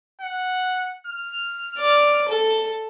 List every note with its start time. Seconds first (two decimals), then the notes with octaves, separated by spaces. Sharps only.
0.21 F#5
1.07 F6
1.78 D5
2.29 A4